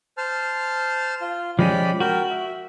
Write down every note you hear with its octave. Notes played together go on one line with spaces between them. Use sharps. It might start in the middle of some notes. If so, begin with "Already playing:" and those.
C5 A5 F6
F4
F3 G#3 C#4 G4 D5 B5
F#4 A#4 G5
E5